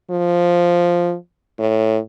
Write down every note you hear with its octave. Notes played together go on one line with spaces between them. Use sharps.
F3
A2